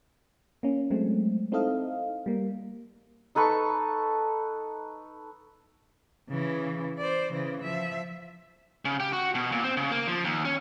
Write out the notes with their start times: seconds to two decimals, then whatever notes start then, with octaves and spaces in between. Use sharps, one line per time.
0.63 A#3 C#4
0.90 F#3 G#3 A3 C4
1.52 C4 D#4 E4 A4 D#5 F5
2.26 G3 A#3
3.35 D#4 A4 B4 C#6
6.29 C#3 E3
6.98 C5 D5
7.32 C#3 E3
7.62 F3 E5
8.85 C#3
9.00 G4
9.13 F#4
9.35 B2
9.52 A#2
9.64 C4
9.77 C#3
9.92 A#3
10.07 F3
10.24 D#2
10.45 C#4